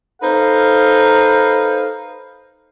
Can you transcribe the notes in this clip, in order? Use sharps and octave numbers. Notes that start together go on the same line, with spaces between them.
D#4 A4 B4 C5 F5